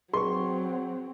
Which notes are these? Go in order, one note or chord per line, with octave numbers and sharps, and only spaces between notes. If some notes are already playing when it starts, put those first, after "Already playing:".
F#3 C4 G#4 C6 C#6